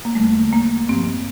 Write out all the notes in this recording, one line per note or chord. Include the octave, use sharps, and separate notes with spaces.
A#3
E2 D3 G3 A3
A#3
G2 F3 C4